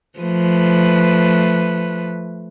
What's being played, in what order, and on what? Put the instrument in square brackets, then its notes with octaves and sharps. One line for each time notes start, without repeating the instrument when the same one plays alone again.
[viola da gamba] F3 A3 B4